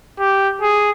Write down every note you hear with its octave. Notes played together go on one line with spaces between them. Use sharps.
G4
G#4